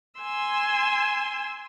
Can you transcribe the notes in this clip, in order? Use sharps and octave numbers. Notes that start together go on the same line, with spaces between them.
G#5 C6 E6